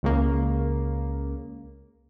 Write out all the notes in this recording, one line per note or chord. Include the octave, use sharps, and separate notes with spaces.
C#2 C#3 A#3